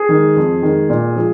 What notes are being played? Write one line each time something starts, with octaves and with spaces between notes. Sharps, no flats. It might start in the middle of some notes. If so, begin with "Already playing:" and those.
Already playing: G#4
D#3 G#3
F2
D#3 G#3
A#2
F3 G#3